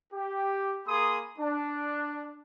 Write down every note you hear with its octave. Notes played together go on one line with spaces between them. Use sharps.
G4
A#3 G#4 B5 C6 D#6
D4